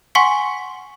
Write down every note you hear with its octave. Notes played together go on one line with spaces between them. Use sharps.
F#5 G#5 C6 C#6 B6 C#7